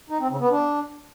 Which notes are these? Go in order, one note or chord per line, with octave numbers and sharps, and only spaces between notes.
D#4
C4
C#3
B3
D4